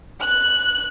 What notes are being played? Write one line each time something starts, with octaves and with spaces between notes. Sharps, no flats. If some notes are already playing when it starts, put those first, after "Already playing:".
F#6